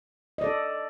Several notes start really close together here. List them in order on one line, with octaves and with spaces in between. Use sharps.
D#5 D5 A4